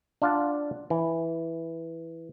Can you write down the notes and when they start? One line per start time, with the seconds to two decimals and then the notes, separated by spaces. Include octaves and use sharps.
0.22 D4 F4 F5 F#5 A5
0.90 E3